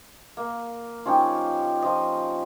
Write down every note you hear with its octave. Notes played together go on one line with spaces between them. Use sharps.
A#3
F3 C#4 D#4 G4
F3 D#5